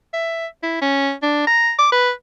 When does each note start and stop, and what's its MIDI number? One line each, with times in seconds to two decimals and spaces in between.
0.13 0.46 76
0.63 0.78 64
0.81 1.12 61
1.22 1.44 62
1.47 1.72 82
1.78 1.89 86
1.92 2.10 71